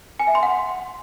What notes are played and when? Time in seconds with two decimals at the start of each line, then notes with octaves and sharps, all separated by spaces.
0.19 G#5
0.27 E5
0.35 C6
0.43 F#5